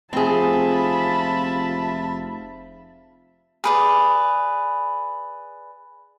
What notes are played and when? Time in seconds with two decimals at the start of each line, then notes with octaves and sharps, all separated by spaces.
0.13 F1 C4 F4 G#4 E5 A5 B5
3.64 G#4 B4 D5